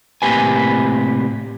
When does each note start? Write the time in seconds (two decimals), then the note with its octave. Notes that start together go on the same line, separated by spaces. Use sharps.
0.22 A2 C3 A#3 G4 B4 G#5